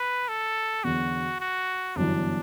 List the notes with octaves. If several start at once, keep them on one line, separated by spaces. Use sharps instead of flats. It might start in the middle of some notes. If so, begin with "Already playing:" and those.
Already playing: B4
A4
E2 D3 F#3 B3 F#4
F#4
G1 F#2 E3 B3 D4 E4